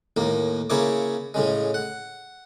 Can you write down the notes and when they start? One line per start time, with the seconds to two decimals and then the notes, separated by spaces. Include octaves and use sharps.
0.17 D#2 A2 A#3
0.70 C#3 A#3 E4 C#5 D6
1.34 A2 C#3 G#3
1.74 F#5